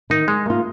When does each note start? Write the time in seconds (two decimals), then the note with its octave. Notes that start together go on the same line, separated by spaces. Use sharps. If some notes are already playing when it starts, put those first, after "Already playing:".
0.10 D#3 D#4
0.28 G#3
0.46 A#3 F4